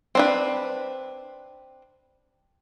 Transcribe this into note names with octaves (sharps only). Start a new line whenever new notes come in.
C4 D4 B4